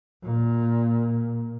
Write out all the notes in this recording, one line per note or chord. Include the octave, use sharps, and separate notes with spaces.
A#2